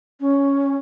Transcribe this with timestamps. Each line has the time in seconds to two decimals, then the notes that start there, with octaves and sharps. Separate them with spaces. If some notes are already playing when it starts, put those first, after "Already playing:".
0.20 C#4